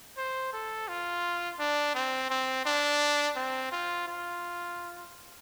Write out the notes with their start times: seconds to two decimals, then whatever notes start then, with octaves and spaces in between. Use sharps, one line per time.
0.17 C5
0.53 A4
0.88 F4
1.59 D4
1.95 C4
2.30 C4
2.66 D4
3.36 C4
3.72 F4
4.08 F4